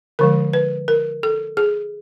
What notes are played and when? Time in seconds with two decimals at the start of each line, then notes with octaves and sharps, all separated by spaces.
0.19 D3 F3 G#3 A#4
0.53 B4
0.88 A#4
1.23 A4
1.57 G#4